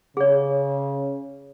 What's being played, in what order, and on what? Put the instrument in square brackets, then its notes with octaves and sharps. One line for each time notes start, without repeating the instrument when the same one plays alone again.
[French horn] C#3 [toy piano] G#4 C#5